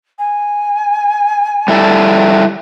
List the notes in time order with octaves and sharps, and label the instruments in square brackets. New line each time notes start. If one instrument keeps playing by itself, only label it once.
[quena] G#5
[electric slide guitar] G3 E4 A4